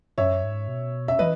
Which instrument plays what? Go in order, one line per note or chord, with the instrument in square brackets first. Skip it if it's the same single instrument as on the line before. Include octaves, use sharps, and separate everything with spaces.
[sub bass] F#2 [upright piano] C#5 E5
[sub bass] G#2
B2
[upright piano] E5
[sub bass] E3 [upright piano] B4 D#5